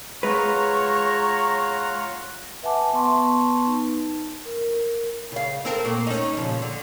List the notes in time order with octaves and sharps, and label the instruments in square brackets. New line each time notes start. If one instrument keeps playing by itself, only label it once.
[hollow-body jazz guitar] G#3 B4 [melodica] F4 F#5 [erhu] C#5 [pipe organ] A#5
[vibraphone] B4 E5 F#5 G#5 A5 D6
B3 B4 A5 C6 C#6
D#4
A#4
[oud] C#3 F5
C4 A4 A#4
A#2 A3 A#3
C#4 D#4
A#2 C#3 F3
D3